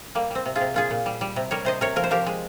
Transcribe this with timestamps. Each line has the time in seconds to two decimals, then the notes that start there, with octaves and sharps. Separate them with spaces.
0.15 G3 A#3
0.30 G3 C4
0.46 C3
0.55 F4 G#4
0.61 C3
0.74 A#2 F4 G#4
0.91 A#2
1.06 G3
1.21 G3
1.36 C3
1.51 G3 A#4 C#5
1.65 C3 C5 D#5
1.81 C3 A#4 C#5
1.96 F3 A#4
2.04 C5
2.11 F3 G4 A#4
2.26 G#3